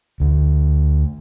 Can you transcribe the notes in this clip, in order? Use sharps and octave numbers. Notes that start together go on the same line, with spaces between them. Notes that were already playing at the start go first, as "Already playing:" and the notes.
D2